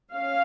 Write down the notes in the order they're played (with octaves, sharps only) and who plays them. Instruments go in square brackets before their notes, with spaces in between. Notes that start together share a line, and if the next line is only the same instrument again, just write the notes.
[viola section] C#4 F5